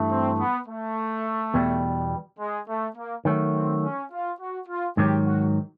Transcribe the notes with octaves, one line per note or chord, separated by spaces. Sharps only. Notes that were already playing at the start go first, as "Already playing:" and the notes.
Already playing: G2 E3 A3
C4
B3
A3
E2 B2 G3
G#3
A3
A#3
D#3 F#3 A3
C4
C#4
F4
F#4
F4
G#2 D#3 F#3 G4
F#4